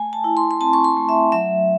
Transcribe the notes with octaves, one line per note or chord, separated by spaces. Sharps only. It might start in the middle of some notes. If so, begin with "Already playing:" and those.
Already playing: A3 G#5
A5
E4
C6
C6
C4 A5
C#6
C6
A3
E5
F#3 E5